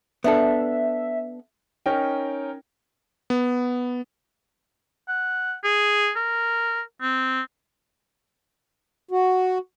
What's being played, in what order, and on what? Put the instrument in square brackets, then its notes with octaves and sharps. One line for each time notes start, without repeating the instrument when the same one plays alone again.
[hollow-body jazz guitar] B3 D4 A4 [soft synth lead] E5
[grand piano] C#4 D#4 A#4 G5
[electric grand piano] B3
[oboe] F#5
G#4
A#4
C4
[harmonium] F#4